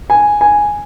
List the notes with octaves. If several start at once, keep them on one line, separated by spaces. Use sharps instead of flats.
G#5
G#5